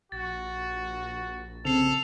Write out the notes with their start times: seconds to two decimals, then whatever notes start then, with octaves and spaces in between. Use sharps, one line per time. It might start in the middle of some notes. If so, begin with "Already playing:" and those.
0.12 A#1 F#4 A6
1.65 C#3 C4 A4 C7 F7